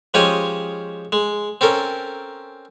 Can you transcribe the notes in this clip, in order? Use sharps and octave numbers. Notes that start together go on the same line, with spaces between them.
F3 G#3 C#4 G4 C#5 D#5
G#3
C4 C#4 A4 A#4